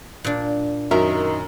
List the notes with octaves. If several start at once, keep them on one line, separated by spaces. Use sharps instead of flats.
A#2 D4
F#2 D#3 A#4 E5 A#5